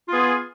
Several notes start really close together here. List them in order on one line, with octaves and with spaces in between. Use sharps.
F4 G#4 B3